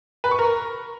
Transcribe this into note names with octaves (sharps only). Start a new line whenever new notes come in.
B4
C#6
A#4